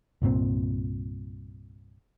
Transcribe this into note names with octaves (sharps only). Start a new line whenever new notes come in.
C2 G2 A#2 C4